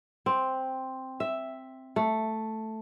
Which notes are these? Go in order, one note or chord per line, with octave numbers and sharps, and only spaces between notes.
C4
E5
A3